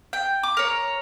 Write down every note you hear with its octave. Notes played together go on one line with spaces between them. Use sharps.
G5
D6
A#4 C#5